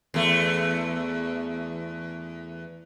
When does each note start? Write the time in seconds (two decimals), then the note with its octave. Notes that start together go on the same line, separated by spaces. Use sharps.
0.14 E2 A3